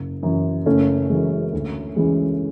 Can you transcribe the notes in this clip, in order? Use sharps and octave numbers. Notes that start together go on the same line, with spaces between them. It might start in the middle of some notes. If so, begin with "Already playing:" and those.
Already playing: F#1
F#2 E3
F#1 A3 C#4
F#2 E3 G#3
D2
C#3 E3 G#3